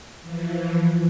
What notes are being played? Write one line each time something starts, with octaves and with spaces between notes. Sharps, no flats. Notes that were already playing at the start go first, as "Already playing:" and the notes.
E3 F3